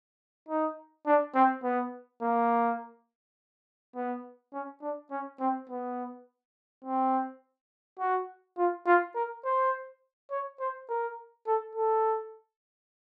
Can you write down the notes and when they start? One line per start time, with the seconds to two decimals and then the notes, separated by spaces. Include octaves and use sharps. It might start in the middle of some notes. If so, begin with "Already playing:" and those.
0.49 D#4
1.06 D4
1.35 C4
1.64 B3
2.22 A#3
3.96 B3
4.53 C#4
4.82 D4
5.11 C#4
5.40 C4
5.69 B3
6.84 C4
7.99 F#4
8.57 F4
8.86 F4
9.15 A#4
9.44 C5
10.31 C#5
10.60 C5
10.89 A#4
11.47 A4
11.75 A4